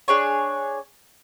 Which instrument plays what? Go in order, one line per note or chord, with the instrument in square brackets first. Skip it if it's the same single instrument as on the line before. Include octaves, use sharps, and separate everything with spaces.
[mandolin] D4 G#4 C#5